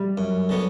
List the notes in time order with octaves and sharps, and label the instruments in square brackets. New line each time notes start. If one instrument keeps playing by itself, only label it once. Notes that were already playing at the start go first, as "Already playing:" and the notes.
Already playing: [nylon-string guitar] G3
[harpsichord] F#2
D3 F#3 B3